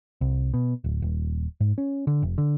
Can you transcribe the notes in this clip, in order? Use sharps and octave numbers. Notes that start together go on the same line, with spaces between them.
C2
B2
D1
D#1
G#2
C#4
D3
F1
D3